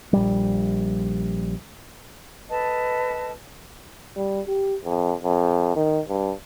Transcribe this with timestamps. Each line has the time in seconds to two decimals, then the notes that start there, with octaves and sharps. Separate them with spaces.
0.13 A#1 G3
2.49 A4 B4 D#5 A5
4.16 G3
4.47 G4
4.84 F2
5.23 F2
5.76 D#3
6.08 G2